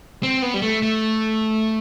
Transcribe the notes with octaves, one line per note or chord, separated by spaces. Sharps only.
C4
B3
G3
A3
A3